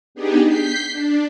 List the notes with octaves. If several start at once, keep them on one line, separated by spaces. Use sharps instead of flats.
B3 D4 D#4 G4 G#4
G6 B6 C7
D4